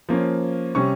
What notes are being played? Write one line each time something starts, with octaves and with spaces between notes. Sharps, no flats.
F3 A#3 C#4
C3 G3 C#4 C#6